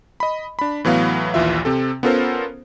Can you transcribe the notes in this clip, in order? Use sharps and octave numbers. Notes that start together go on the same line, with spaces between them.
D#5 B5
D4 B5
A2 E3 F#3 B3 F5
A#1 D#2 E3 F4 E5
C3 C4 A4
B3 C#4 F4 A4 A#4 C5